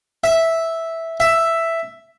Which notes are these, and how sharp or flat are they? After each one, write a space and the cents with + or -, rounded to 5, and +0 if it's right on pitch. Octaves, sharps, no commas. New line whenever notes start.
E5 -5
E5 +5